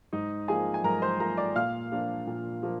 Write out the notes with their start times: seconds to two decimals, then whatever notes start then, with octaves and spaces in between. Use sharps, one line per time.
0.13 G#2 D#4 D#5
0.48 F3 A#3 G#4 G#5
0.74 G#5
0.84 G#2 A#4 A#5
1.02 C5 C6
1.19 F3 A#3 A#4 A#5
1.37 D5 D6
1.56 A#2 F5 F6
1.92 F3 A#3 D4
2.27 A#2
2.63 F3 A#3